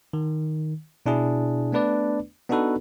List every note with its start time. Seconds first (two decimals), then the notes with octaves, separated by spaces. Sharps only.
0.13 D#3
1.06 B2 D4 E4 G#4
1.72 A3 B3 D4 B4 D5
2.49 B3 D4 D#4 F#4 A4 B4